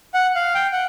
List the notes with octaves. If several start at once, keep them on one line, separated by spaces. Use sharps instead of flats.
F#5
F5
G5
F#5